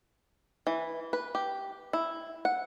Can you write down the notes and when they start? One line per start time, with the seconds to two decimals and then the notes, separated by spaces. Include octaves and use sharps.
0.67 E3
1.13 B4
1.35 G4
1.93 E4
2.45 F#5